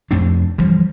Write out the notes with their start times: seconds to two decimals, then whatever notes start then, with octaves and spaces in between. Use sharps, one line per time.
0.11 F2 A3 C4 D4
0.58 G2 E3 F3 G3